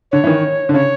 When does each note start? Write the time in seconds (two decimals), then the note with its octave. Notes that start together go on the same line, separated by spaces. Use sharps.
0.12 D3 C#5
0.24 E3
0.27 D#3
0.69 D3
0.74 C#3 C#5